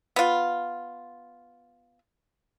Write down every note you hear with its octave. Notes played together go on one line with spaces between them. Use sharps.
B3 F4